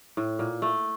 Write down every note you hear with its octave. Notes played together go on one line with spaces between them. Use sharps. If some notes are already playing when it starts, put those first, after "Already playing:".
A2
A#2
A3